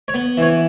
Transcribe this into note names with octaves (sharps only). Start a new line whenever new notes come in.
C#5
B3
E3 C#5